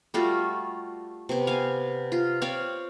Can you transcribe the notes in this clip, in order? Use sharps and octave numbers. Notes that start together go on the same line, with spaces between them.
G3 A3 F4 F#4
C3 B3
F5 G#5
F4
C4 C#5 D5 F5